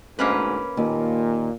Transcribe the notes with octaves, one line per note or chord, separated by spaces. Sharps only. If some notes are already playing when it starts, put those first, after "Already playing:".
D2 G#2 A#3 C#4 B4
D#2 A#2